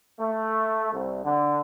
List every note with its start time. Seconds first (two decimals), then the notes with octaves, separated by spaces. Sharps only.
0.18 A3
0.92 C2
1.24 D3